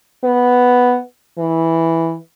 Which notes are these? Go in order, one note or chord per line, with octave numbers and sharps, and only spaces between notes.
B3
E3